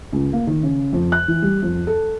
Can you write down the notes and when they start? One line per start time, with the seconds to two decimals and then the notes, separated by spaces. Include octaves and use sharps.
0.13 C#2
0.33 A#3
0.47 D#3
0.63 C#3
0.93 F2
1.12 F#6
1.28 E3
1.42 G3
1.62 F2
1.87 A4